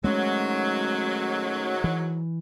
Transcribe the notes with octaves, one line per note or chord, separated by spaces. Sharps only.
G#2 D#3 F#3 G#3 A3 C#4
E3